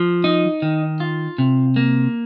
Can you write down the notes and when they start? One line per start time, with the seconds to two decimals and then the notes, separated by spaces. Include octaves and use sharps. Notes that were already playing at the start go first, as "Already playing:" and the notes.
Already playing: F3
0.24 D#4
0.62 D#3
1.00 F4
1.38 C3
1.76 A#3